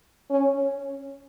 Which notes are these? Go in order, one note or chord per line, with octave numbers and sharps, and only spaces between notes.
C#4